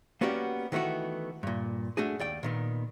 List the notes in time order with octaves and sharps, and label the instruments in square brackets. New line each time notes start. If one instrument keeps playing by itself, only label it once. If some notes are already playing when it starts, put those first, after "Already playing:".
[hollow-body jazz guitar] A#3 B3 C#4 F#4 G4 D5
D#3 E3 A3 B3 F#4
G2 A#2
A3 D4 F#4 G#4
D#2 D5 G5
A#2 D#3 B3